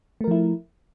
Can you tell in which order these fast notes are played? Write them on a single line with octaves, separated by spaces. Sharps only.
A3 A#4 F3 E4